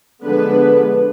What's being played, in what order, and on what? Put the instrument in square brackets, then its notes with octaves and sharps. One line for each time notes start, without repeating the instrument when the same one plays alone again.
[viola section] D3 F3 G#3 B3 D4 B4